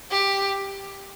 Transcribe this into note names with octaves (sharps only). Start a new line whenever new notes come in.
G4